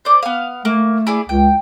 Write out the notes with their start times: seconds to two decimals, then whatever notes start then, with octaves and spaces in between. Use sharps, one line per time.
0.05 C5 D5
0.23 B3 F5
0.65 A3 A#3
1.07 E4 G#4 D5
1.29 C#2 G5